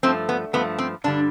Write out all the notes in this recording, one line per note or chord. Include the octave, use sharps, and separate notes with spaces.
G2 F3 A3 C4
B3
G2 F3 A3 B3
C4
G2 D3 G3 D4